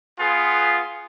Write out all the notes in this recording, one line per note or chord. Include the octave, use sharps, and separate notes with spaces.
B3 F4 G#4